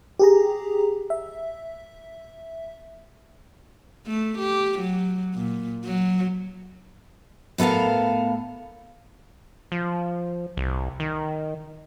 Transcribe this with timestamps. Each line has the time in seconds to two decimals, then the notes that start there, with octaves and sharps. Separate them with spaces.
0.19 G4 G#4 A#5
1.10 E5
4.07 A3
4.38 G4
4.79 F#3
5.34 A#2
5.84 F#3
7.58 A2 B3 A4 A#4 F5
9.72 F3
10.57 C2
11.00 D#3